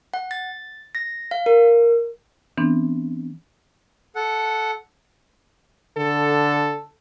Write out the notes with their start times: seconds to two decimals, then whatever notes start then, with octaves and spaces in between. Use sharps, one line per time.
0.14 F#5
0.31 A6
0.95 A#6
1.31 F5
1.46 A#4
2.57 E3 B3 C4 D4
4.16 A4 F#5
5.97 D3 A4